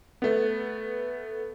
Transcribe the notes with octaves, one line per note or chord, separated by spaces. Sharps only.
A3 B3